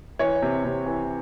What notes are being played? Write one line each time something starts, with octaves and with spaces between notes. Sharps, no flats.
E3 C#5
C3
C3
E3